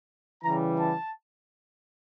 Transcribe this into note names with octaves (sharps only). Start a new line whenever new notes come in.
C#3 E3 G3 A#5
A5